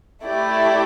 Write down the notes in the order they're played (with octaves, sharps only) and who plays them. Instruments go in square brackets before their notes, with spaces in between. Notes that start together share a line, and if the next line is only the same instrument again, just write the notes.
[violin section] A3 E4 G4 D5